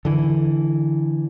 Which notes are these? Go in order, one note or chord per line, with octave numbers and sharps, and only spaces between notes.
D3 E3